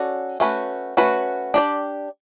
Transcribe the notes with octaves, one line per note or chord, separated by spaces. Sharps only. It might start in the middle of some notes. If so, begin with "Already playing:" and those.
Already playing: C#4 F#4 A4 D5
A3 C#4 F#4 B4
A3 C#4 F#4 B4
D4 G4 D5